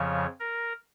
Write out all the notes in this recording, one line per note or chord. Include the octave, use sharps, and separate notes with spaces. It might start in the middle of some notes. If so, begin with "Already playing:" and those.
Already playing: F2 C#3 F3 C#5
A#4